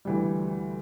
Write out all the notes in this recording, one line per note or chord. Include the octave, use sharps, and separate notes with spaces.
D2 E3 G3